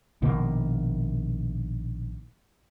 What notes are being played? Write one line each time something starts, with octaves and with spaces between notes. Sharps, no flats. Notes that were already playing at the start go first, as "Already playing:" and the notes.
A#1 B2 D#3 A#3